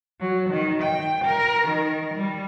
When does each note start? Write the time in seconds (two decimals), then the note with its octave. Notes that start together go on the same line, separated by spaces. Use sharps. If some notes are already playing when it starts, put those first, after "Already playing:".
0.20 F#3
0.50 D#3
0.83 G5
1.25 A#4
1.68 D#3
2.14 G3